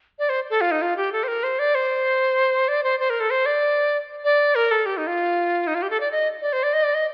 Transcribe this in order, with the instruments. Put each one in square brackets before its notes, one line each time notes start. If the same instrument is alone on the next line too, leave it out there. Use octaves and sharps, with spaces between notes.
[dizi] D5
C5
A4
F4
D#4
F4
G4
A4
C5
A#4
C5
D5
C5
D5
C5
C5
A#4
A4
C5
D5
D5
A#4
A4
G4
D#4
F4
D#4
F4
G4
A4
D5
D#5
D5
C5
D5
D#5
D5
D#5